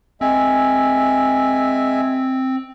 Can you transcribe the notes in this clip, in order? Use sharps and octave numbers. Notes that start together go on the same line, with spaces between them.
G#3 C4 E5 G#5